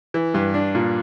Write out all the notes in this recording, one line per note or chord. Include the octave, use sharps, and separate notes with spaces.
E3
G2
D4
A#2